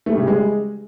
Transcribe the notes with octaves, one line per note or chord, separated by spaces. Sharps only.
A3
G3
C#3
G3
G#3